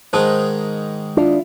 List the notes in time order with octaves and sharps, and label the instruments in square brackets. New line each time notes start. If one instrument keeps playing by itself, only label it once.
[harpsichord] G#2 D#3 G#3 [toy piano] C5 A5 D#6
[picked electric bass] D4 [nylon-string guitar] E4 F4